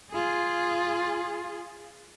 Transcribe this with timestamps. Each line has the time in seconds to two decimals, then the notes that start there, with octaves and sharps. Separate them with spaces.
0.11 F4 G#4